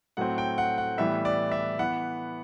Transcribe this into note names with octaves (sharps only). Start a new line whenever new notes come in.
A2 F#3 A3 C4 F#5
G5
F#5
F#5
A2 E3 G3 B3 E5
D5
E5
E3 B3 F#5